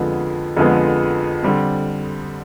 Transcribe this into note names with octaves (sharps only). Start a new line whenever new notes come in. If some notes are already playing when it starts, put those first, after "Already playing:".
Already playing: F2 D3 F3 G#3 B3
F2 D3 F3 G#3 B3
D3 G3 C4